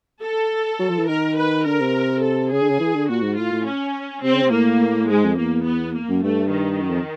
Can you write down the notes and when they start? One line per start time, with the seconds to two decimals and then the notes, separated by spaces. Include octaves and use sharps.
0.23 A4
0.79 F#3
0.90 F3
0.99 E3
1.08 D#3 A#4
1.38 B4
1.66 D3 A#4
1.81 C3
2.23 A4
2.52 C#3 G#4
2.62 D3
2.70 C#3
2.80 E3
2.95 D3
3.09 A#2 F#4
3.23 G#2
3.38 A2 F4
3.52 A2
3.66 C#4
4.23 C3 C4
4.33 C#3
4.42 C3
4.52 A2 A#3
5.09 G#2 G#3
5.24 F2
5.38 E2 A#3
5.66 B3
5.96 A#3
6.09 F#2
6.23 G2 A3
6.52 D#3
6.81 F#2
6.90 F2